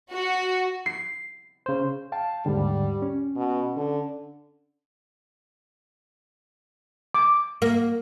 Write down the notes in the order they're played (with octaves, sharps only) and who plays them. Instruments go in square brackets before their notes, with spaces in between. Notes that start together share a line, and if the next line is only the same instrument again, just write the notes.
[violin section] F#4
[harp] C7
[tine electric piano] C#3 C5
[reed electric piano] F5 G5 A5
[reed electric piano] D#2 G#2 D3 [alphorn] G3
[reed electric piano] C#4
[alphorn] B2
D3
[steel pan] D6
[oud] A#3